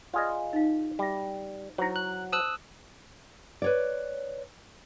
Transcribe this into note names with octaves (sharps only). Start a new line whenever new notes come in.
F4 G#4 D5 D#5 B5
D#4 F5
G3 F#4 E5
F#3 E4 C5 C#5 A#5
F#6
C5 A5 D#6 E6 F#6
B4 C#5 D5